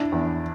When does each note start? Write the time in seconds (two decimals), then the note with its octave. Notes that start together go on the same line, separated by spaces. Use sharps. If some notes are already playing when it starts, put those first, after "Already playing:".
Already playing: D4 E4
0.12 E2